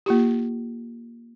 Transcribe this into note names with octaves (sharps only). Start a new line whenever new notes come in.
A#3 F4 G4